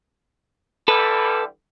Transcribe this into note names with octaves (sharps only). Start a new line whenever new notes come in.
D3 E3 G3 A4 B4